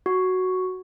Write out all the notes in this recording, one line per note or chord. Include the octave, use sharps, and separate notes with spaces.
F#4